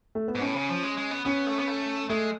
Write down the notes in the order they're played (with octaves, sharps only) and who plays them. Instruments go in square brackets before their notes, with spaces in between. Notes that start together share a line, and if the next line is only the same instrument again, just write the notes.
[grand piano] A3
B3
[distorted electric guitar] G#2
[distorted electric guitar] A2 [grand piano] C#4
[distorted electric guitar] C#3
F3
G#3
G#3
B3
[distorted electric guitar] B3 [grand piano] C#4
[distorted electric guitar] A3
B3
A3
[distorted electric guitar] G#3 [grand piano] A3